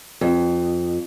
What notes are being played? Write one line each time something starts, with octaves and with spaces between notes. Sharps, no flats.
F2